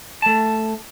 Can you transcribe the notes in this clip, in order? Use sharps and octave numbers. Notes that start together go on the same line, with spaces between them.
A3 A5